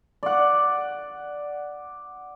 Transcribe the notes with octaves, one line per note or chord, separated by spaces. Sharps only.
D5 F#5